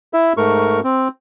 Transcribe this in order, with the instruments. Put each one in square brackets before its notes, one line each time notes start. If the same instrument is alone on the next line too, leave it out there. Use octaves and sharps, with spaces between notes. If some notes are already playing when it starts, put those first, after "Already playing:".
[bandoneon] E4 E5
G#2 A3 A#4 C#6
C4